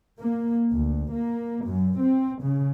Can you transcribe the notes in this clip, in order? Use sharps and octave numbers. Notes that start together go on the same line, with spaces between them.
A#3
D2
A#3
F#2
C4
C#3